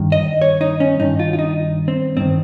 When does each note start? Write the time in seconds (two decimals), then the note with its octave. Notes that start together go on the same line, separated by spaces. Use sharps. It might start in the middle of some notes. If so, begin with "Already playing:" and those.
Already playing: G2 D#3
0.12 D#5
0.42 C#5
0.61 D#4
0.80 C#4
1.00 G2 D#3 D#4
1.19 F4
1.33 F4
1.39 D#4
1.88 C4
2.17 G2 D#3 C4